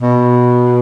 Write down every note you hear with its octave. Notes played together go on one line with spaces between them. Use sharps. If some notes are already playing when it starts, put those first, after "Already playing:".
B2